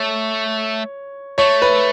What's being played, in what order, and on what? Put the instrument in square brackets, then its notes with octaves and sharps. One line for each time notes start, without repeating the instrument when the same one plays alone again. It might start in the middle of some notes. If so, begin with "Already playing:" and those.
Already playing: [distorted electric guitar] A3 [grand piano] C#5
[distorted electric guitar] A3 [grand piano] C#5
[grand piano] B4